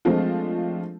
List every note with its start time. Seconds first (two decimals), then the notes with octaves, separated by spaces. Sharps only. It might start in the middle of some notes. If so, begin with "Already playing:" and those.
0.05 F3 G#3 A3 C4 D4 F4